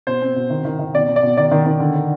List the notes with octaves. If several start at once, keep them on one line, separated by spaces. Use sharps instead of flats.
B2 C5
C4
B2
D#3
D#3
D#3
B2 D5
B2
D5
B2
D#3 D5
D#3
D#3
D3
D3